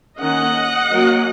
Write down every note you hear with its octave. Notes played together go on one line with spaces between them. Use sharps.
D#3 A#3 C#4 D#5 F#5
F#3 A#3 C#4